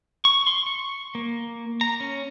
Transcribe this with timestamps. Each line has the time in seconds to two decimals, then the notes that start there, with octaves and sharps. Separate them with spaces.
0.25 C#6
0.47 C6
0.67 C#6
1.15 A#3
1.81 A#5
2.00 C#4